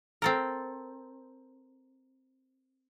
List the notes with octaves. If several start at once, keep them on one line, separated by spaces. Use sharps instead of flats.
C4 A4 A#4